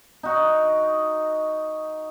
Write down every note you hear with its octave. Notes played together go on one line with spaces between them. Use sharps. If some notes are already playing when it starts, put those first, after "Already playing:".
D#4 F#4